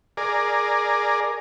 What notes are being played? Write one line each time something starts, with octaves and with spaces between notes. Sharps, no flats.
G#4 A#4 D5